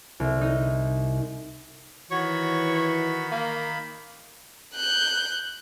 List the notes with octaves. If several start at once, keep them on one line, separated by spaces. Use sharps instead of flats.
C2
D#4
D#3 E3 F#4 C#5 B5 C#6
A#3
F#6 G6